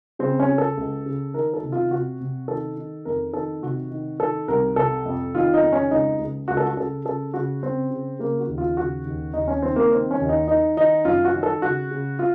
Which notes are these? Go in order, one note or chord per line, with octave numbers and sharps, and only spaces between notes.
C#3 C4
C#4
C#3
A4
C#2
C#3
D#3 A#4
A4
C3
F4
C3 F#4
C3
D#3 A4
D#3
F2 A#4
D#3 A4
C3 F#4
D#3
D#3 A4
C2 A#4
C3 A4
F2
D#3 F4
D#4
F2
C#4
C#2 D#4
C#2
C#2 F#4
A4
F#4
C#3 A4
C#3 A4
C#3 F#4
C#3 C4
C#3
C#3 A#3
F#4
D#2
F4
C#3 F#4
D#2
D#2 D#4
C#4
D#3 C4
A#3
D#3 C4
C#4
D#2
D#4
D#3 D#4
D#3 D#4
F#2 F4
F#4
D#3
A4
C#3 F#4
C#3
F4